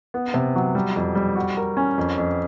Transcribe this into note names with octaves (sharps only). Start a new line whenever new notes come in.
B3
C3
F#3
G3
F2
G3
F#4
A#4
C#4
F2
F2